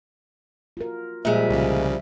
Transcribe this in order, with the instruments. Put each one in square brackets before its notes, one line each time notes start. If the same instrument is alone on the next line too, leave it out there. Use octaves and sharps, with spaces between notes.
[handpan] F4 F#4 A#4
[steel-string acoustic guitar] A#2 G#3 [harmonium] F3 G3 [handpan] E5
[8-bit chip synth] C2 C#3